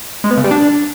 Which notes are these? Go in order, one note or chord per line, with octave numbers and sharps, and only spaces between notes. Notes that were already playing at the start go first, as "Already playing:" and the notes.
G#3
B3
C#3
G3
D4